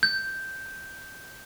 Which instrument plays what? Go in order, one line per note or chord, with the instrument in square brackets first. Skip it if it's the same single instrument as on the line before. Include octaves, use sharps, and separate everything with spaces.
[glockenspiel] G6